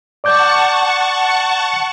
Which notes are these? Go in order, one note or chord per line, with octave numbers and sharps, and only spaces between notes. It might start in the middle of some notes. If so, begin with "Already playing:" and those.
D5 F#5 A5 C#6 D6 G6